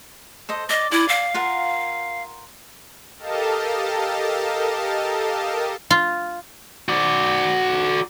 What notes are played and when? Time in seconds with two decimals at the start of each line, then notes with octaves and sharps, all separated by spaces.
0.49 A4 C5 D#5
0.69 D5 D#5
0.91 E4 D5 G#5
1.08 F5
1.34 F4 A#4 F#5
3.19 G4 A4 A#4 D#5 F5 A5
5.90 F4
6.89 F#4 D5